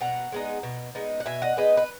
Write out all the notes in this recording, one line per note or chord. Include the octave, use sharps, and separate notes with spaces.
B2 F#5 A#5
G#3 B3 D#4
B2
G#3 B3 D#4
F#5
B2 E5 G#5
D#5 F#5
G#3 B3 D#4 B4 D#5
B4